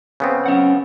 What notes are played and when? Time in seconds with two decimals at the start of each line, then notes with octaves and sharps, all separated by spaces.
0.20 C#3 B3 C4
0.46 C#4 F#5